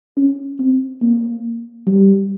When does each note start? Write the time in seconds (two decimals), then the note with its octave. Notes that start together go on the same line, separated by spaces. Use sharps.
0.17 C#4
0.59 C4
1.02 A#3
1.87 G3